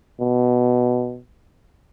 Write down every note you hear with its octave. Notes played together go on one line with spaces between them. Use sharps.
B2